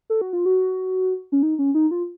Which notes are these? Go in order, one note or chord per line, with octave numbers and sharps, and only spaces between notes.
A4
F#4
F4
F#4
C#4
D#4
C#4
D#4
F4